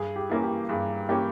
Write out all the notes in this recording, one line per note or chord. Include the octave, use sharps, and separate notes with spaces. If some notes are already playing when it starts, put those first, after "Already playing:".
Already playing: G2 G#4
G4
E3 A#3 C#4
G4
G2 G#4
E3 A#3 C#4 G4